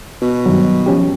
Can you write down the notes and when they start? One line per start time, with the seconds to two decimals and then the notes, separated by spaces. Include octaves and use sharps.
0.21 B2
0.46 G2 D#3 F#3
0.86 F3 C#4 G4